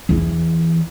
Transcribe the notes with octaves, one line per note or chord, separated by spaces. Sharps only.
E2 E3